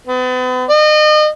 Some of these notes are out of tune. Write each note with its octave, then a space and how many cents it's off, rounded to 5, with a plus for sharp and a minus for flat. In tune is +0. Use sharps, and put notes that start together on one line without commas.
B3 +40
D#5 -35